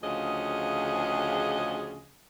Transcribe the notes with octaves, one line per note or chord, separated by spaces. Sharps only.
D2 C#3 F3 G#4 D#5